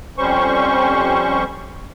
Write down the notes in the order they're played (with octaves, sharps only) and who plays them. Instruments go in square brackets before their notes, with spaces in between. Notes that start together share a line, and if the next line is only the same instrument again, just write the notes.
[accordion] F2 G3 C#4 C5 C#6